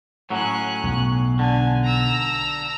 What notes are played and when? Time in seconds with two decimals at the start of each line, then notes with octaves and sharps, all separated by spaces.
0.30 A2 F#3 C#4 F#6
0.84 B1
1.39 D3 G#5
1.83 A#5 E6